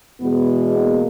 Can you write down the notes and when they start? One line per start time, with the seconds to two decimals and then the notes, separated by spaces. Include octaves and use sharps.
0.21 E2 B2 G#3 B3
0.76 A#3